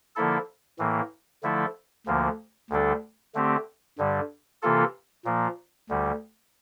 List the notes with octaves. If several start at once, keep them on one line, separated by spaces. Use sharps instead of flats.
D3 F3 A#3 E4 A4
A2 E3 A#3
D3 F3 A3 E4 A4
D2 D3 F3 A#3
D2 D3 G3 D4 A4
D3 A3 C4 G4
G2 D3 G3
C3 E3 A#3 F4 A4
A#2 F3 A#3
D2 D3 G3